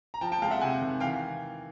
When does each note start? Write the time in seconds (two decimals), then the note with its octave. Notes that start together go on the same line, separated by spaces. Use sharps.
0.14 A#5
0.21 F3 G5 A5
0.32 G5 A5
0.42 G#3 F5 G5
0.51 E5 F#5
0.61 C3 F#5 G#5
0.82 D#3
1.00 E3 F5 G5